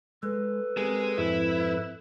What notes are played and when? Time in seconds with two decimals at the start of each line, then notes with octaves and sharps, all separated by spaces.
0.23 G#3 A4 B4
0.77 G#3 C4 G4 A#4
1.18 F2 G#2 C4 E4